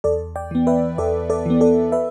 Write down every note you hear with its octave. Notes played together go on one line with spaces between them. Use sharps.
E2 A4 D5
D5 G5
E3 B3
B4 E5
E2 A4 D5
A4 D5
E3 B3
A4 D5
B4 E5